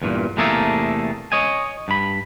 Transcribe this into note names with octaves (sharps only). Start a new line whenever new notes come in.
E2 G2 A#2
E2 C3 A3 A#3 G#4 A4
C#5 D#5 G#5
G2 B5